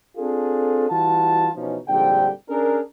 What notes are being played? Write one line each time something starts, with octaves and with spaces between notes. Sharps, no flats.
C4 D4 F4 G#4 A4
E3 G3 F4 F#4 A5
B2 E3 F3 C#4 D#4
A#1 F2 G#2 D3 G3 G5
C#4 D4 G#4 A#4